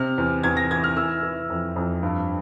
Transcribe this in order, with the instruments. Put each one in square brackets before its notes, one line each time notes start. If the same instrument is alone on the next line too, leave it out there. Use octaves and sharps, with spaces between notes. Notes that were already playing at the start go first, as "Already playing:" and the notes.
Already playing: [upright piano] C3 F6
E2
E2 G#6
A#6
E3 G#6
F6
E3 E6
E3
F2
F2
G2